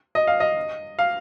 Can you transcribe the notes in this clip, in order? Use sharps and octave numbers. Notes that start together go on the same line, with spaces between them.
D#5
F5
D#5
F5